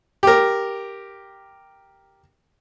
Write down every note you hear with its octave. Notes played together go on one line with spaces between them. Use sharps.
G4 A#4